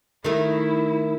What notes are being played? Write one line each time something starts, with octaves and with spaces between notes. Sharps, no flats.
D#3 A3 E4